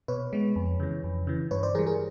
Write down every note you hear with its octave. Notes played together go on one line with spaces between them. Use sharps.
B2 B4 C#5
G#3 B3
F2
C#3 E3
F2
C#3 E3
G2 B4 C#5
C5 D5
E3 G3 G#4 A#4
G#4 A#4